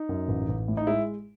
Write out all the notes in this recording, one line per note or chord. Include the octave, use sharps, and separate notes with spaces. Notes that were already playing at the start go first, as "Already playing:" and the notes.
Already playing: D#4
F#2
A1
A1
A2
D#4
G#3 E4